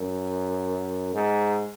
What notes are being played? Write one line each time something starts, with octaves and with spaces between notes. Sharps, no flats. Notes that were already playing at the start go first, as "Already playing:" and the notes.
Already playing: F#2
G#2